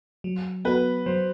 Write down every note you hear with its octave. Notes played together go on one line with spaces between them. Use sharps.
F#3
B3 F#4 B4
F#3 C5